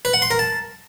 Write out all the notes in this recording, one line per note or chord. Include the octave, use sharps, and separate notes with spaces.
B4
F#5
C6
A#4
A5